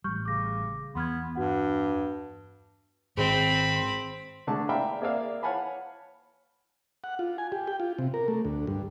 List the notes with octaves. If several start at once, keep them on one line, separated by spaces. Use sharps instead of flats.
A1 G3 C#6 F6 G6
C#3 D6 A#6
E2 B3 C6 F6 G#6
G2 F#4 F#5
G#2 D#3 C4 G#4 B5
C6
D3 G#3 A3 A5
D5 E5 F5 G5 A#5 B5
A#3 G#4 C5 D5 E5 F5
C#5 F5 F#5 G#5 A5 B5
F#5
F4
G#5
G4
G5
F4
C3
A#4
A3
D2
G2